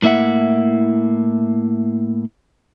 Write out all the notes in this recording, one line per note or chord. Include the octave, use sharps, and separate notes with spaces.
A2 A#3 E4 E5 F#5